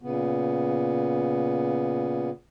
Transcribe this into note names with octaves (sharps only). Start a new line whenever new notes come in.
A#2 C#3 B3